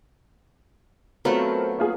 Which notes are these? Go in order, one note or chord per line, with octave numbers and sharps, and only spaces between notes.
F#3 A3 B3 C4 F4 A#4
A#3 F4 G#4